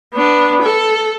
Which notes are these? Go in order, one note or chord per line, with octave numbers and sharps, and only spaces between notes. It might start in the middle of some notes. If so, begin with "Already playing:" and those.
B3 D4
A4